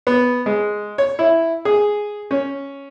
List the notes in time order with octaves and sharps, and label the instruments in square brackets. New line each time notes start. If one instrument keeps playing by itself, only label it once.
[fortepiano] B3
G#3
C#5
E4
G#4
C#4